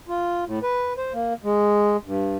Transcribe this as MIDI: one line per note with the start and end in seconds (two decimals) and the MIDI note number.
0.09 0.44 65
0.45 0.59 45
0.63 0.93 71
0.97 1.13 72
1.14 1.33 58
1.44 1.97 56
2.05 2.38 43